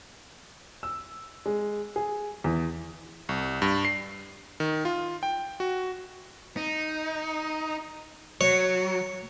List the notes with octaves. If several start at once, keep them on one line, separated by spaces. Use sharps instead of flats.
E6
G#3
G#4
E2
C2
G2
C7
D#3
F4
G5
F#4
D#4
F#3 C#5